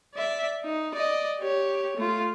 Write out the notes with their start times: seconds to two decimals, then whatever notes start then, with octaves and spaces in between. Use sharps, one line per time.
0.15 D5 E5
0.64 D#4
0.94 D5 D#5
1.40 G4 C#5
1.97 A3 F4